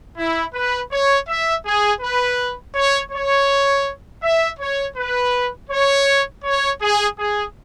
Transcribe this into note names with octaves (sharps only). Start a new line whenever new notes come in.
E4
B4
C#5
E5
G#4
B4
C#5
C#5
E5
C#5
B4
C#5
C#5
G#4
G#4